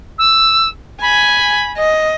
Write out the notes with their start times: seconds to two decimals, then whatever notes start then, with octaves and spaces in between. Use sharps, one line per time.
0.18 E6
1.02 G#5 B5
1.78 D#5